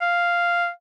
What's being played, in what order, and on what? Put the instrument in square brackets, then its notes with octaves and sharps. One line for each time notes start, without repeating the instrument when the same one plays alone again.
[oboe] F5